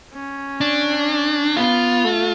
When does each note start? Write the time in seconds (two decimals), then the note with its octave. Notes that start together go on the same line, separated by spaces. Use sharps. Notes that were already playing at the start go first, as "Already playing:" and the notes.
0.13 C#4
0.61 D4
1.57 B3 F4
2.04 A3